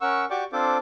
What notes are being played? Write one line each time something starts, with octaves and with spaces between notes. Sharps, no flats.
C#4 A#4 F#5 C#6 E6
F#4 G4 D5 G5 C#6 D6
C4 D4 F4 A4 C5 D6